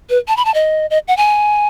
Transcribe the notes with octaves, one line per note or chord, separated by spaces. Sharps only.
B4
A5
B5
A5
D#5
D#5
F#5
G#5